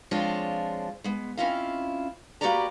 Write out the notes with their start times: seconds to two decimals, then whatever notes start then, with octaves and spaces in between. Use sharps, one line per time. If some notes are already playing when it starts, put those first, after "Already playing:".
0.11 F3 G#3 C4 D4 F4 C#5
1.04 G#3 B3
1.37 C4 C#4 E4 F4 D#5 F5
2.41 A#3 F#4 G4 B4 D5 A#5